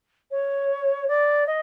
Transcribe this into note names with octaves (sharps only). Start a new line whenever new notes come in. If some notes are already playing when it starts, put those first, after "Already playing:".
C#5
D5
D#5